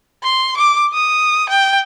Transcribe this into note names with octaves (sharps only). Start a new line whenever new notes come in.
C6
D6
D#6
G5